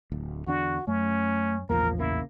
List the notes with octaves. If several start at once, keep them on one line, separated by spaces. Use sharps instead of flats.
D1 D2
E2 D3 D4 F#4
F#2 A3 C#4
A#1 E2 F3 A#3 A#4
C#3 A#3 E4